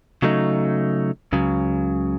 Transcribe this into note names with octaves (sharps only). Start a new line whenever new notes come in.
C#3 F#3 A3 D#4
C#2 C#3 F#3